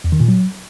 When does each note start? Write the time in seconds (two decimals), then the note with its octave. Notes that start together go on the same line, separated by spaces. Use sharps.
0.04 E2
0.12 D#3
0.20 A#2
0.28 F#3